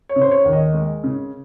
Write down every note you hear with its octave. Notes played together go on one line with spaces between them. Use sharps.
C#5
C#3
C5
C#5
D#2
D#5
G#3
C#3